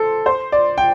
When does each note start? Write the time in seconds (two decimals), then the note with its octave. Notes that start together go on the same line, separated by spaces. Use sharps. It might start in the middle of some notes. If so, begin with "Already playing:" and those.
Already playing: A4 C5
0.26 C5
0.52 D5
0.78 G5